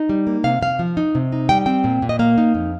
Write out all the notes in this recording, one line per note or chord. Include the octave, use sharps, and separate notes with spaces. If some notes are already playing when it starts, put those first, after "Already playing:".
Already playing: D#4
G3
A#3
C3 F5
C3 F5
F3
D#4
C3
D#4
G3 G5
C4 G5
A#2
A#2
D#5
A#3 F5
D#4
F2